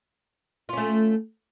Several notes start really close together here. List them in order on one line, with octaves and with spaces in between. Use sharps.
F4 C#4 A3